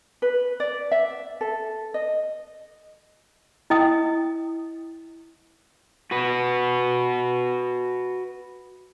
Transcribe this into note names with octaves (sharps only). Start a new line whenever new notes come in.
B4
D5
E5
A4
D#5
E4 D#5 G5 D#6
F#4 B4